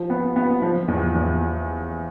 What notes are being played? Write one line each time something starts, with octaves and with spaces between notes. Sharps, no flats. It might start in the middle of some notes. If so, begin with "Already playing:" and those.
Already playing: F3
B3
B3
F3
E2
E2